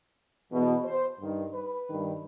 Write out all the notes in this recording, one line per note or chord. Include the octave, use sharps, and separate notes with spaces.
E2 B2
C5
G2
D#3
B4
G2 D#3